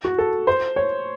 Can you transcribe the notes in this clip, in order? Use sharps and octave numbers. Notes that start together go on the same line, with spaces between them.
F#4
A4
C5
C#5